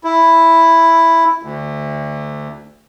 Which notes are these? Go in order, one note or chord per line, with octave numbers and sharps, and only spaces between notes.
E4
D2